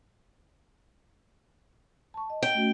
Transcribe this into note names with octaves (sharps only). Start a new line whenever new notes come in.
A5 C#6
D#5
G5
A3 C#4 F#4